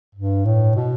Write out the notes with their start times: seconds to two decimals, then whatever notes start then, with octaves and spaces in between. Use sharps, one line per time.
0.15 G2
0.45 A2
0.75 B2